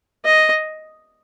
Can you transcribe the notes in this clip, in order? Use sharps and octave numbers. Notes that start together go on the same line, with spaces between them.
D#5